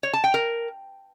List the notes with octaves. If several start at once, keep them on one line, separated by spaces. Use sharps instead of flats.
C#5
A5
G5
A#4